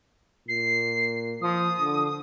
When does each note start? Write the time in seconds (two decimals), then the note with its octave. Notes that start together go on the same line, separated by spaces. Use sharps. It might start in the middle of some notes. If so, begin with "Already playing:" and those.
0.48 A#2 C7
1.41 F3 D#6
1.80 D3